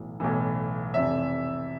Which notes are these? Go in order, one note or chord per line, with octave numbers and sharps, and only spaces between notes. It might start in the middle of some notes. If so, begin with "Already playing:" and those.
Already playing: B1 A2 E3
B1 A2 E3
F1 F2 C3 E3 E5